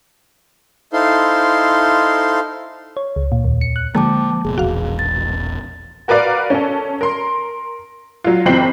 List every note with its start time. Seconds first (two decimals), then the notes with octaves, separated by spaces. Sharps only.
0.93 D#4 E4 A4 C5 F5 C6
2.97 C#5
3.16 C#2
3.32 A#2
3.44 D#2
3.61 C#7
3.76 F#6
3.95 D3 F3 G#3 A#3 G5 A5 D6
4.45 F#1 B2 G#4
4.58 E1 A#1 E2 F#4 F5
4.99 A6
6.08 F#4 A#4 B4 D5 F5
6.50 C#4 A4
7.01 A#4 C6
8.24 F#3 F4
8.46 F#1 E3 C4 G5 C7 F#7